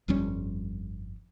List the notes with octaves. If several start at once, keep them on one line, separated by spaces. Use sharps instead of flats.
G1 F2 G3 C#4